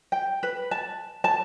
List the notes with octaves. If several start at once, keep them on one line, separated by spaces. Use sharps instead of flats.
G5
B4
A5
A5